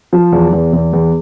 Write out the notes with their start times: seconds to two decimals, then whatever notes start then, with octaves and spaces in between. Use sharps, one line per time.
0.13 F3
0.32 E2
0.53 E2
0.73 E2
0.93 E2